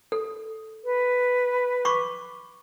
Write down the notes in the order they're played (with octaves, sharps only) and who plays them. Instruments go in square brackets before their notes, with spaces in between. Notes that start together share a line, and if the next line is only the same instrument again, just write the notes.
[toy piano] A4
[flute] B4
[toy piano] B5 C#6 D6